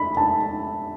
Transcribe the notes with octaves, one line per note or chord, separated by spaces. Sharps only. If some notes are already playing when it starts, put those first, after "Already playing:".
Already playing: B5
A5